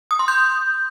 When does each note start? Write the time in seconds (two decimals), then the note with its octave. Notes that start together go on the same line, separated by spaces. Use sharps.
0.11 D#6
0.19 C6
0.28 G6